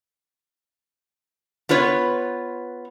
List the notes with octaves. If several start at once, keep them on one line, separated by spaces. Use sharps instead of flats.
B3 F4 B4 C#5